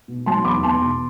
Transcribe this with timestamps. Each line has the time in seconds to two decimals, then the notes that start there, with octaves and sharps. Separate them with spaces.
0.08 B2
0.26 F#3 A5 C6
0.45 E2 B5 D6
0.63 E2 A5 C6
0.82 B2